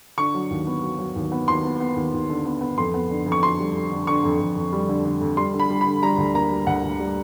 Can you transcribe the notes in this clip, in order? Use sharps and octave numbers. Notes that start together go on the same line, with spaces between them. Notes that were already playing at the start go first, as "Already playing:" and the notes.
D3 C#6
F#3
D#2
B3
F#3
F#3
D#2
B3
D#2 C6
B3
B3
D#2
D#2
D3
B3
B3
F2 C6
B3
D3
F2
C#6
D3 C6
G3
D3
D3
D3 C#6
F2
F2
F2
G3
D3
D3
F2
G3 C6
D3
B5
G3
B5
D3
G3 A#5
D2
A#3 A#5
G3
D2 F#5
D2
G3